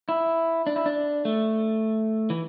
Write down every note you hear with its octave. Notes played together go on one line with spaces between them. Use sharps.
E4
D4
E4
D4
A3
E3